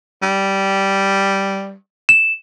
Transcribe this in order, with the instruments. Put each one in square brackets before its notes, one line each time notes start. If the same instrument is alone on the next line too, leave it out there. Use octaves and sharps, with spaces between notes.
[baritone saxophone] G3
[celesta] E7